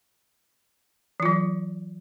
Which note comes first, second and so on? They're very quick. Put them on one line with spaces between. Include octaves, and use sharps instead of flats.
E3 F4 F#3